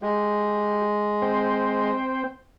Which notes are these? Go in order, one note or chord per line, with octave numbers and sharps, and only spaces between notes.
G#3 G4
C4 C5 G5